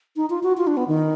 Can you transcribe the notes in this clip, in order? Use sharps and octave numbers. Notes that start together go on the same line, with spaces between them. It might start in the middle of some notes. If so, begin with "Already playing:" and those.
D#4
F4
F#4
F4
D4
B3
D#3